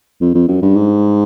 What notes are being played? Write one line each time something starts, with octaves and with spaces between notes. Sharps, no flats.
F2
F2
F#2
G2
G#2